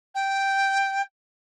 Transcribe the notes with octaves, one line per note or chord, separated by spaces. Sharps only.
G5